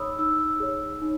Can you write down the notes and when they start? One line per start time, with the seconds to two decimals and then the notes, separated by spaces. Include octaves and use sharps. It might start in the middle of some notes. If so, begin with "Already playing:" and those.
Already playing: D#4 G#4 C#5 B5 D#6 E6
0.19 D#4 E6
0.60 G#4 C#5
1.02 D#4